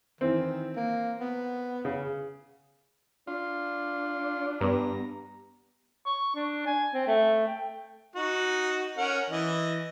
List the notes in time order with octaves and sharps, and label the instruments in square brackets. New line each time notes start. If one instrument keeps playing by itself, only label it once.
[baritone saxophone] D#3 [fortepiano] E3 C4
[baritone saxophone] A#3
B3
[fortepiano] C#3
[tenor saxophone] D4 [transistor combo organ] F4
[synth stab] G2 [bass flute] B3 [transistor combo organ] A#5
[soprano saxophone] C#6
D4
G#5
C4
A3
G5
[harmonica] D#4 F#4
C#4 A#4 F#5
E3 D#5